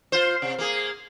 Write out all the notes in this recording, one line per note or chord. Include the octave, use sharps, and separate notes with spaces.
F4 C5
C3
A#3 G#4